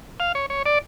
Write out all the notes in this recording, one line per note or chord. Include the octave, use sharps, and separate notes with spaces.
F5
C#5
C#5
D5